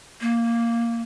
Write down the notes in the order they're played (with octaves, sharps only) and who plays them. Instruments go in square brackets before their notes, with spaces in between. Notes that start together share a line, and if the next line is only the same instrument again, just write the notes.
[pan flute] A#3